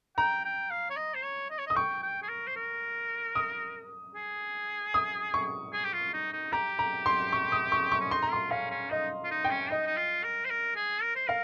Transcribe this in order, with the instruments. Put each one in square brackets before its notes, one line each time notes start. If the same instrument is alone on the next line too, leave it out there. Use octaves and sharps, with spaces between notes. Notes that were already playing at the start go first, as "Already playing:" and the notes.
[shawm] G5 [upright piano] A#5
[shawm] G5
F5
C#5
D#5
C5
C#5
D#5
C#5
[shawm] D#5 [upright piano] D#6
[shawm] G5 [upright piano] C#6
[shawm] G5
G#4
A#4
C5
A#4
[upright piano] D#6
[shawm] G#4
[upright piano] D#6
C#6
[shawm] G#4
G4
F4
D#4
D#4
[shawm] G4 [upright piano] A#5
[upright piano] A#5
C6
C#6
D#6
C#6
C#6
[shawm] C#4
[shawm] D#4 [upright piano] C6
[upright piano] A#5
[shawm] F4 [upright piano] C6
[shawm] C#4 [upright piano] F5
[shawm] C#4
[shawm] D#4 [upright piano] D#5
[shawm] F4
D#4
[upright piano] G5
[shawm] C#4
[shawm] D#4 [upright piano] D#5
[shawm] D#4
F4
A#4
C5
A#4
G#4
A#4
C5
[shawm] A#4 [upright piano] F5